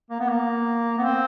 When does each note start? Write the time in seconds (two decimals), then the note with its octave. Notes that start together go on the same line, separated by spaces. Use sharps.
0.10 A#3
0.20 B3
0.30 A#3
0.98 B3
1.03 C4